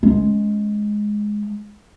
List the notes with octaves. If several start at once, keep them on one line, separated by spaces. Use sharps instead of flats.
G#3 C#4